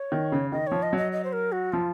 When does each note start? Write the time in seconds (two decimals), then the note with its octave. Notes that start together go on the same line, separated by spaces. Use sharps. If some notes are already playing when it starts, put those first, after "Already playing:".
Already playing: C#5
0.12 D#3
0.32 C#3
0.52 D#3 D#5
0.67 F3 C#5
0.83 D#5
0.93 F#3 D#5
1.12 D#5
1.24 C5
1.33 A#4
1.52 F#4
1.73 F3 F4